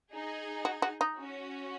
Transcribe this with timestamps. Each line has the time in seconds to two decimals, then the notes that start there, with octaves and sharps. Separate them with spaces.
0.12 D#4 G#4
0.65 F#4
0.82 F#4
1.01 D#4
1.18 C#4 F#4